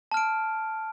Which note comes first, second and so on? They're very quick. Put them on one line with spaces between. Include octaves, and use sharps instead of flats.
A5 F6 D7